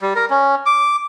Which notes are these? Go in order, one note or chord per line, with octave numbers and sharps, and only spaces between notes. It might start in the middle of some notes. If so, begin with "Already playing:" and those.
G3
A#4
C#4
D6